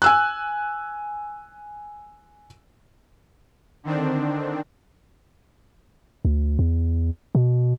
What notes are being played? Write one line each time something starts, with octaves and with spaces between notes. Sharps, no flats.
G#5 E6 F#6
D3 D#3 C4 D4
D2
E2
B2